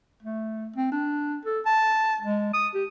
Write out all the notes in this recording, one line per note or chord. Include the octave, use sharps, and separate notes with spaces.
A3
C4
D4
A4
A5
G#3
D#6
G4